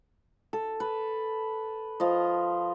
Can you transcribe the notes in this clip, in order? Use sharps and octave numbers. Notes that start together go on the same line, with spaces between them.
A4
B4
F3 F4 D#5